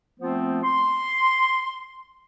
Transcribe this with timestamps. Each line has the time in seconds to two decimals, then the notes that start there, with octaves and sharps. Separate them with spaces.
0.20 F3 A3 B3 C4 F4 C5
0.63 C6